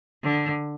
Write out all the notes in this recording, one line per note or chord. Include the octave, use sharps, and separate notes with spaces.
D3